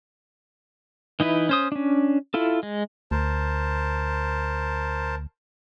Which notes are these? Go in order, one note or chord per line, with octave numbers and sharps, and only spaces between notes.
E3 D#4 E4 B4
C#4 C5 D#6
C#4 D4
E4 F4 A4
G#3
D2 A#4 C5 A5